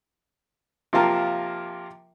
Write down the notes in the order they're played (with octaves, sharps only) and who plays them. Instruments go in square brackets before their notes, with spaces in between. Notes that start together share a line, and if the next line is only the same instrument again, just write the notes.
[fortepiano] C3 F3 A#3 F4 A#4 A5